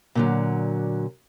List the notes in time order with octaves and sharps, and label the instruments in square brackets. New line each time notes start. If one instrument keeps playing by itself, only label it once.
[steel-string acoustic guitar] A#2 D3 F#3